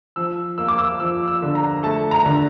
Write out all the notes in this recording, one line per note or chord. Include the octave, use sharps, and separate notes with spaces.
F3 E6
A#3 E6
D6
E6
F3 E6
E6
D3
A#5
A3 A5
A#5
D3